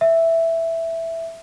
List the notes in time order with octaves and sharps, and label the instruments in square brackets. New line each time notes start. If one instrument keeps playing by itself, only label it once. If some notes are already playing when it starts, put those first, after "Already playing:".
[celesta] E5